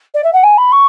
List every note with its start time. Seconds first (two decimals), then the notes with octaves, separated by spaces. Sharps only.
0.14 D5
0.24 E5
0.33 F#5
0.43 G#5
0.57 B5
0.72 C#6